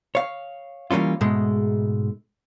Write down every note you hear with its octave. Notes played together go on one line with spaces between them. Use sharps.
C#5 F5
E3 G3 A#3 C#4 F4
G#2 B2 G#3 A3